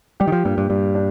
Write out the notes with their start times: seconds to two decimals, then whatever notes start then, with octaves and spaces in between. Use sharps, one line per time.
0.20 G3 G4
0.27 D#3
0.32 F3
0.45 G2 A#2
0.58 G2
0.70 G2 G3
0.95 D4